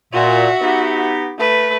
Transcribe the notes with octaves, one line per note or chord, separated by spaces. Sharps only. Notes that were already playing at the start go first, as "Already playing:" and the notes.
A#2 F#4 E5
B3 D#4 G4
A3 B4